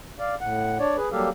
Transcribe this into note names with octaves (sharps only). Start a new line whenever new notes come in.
D5 F5
A2 F#5
D4 C#5 D5
G#4 B4
F#3 G3 A#3 G4 A4 F5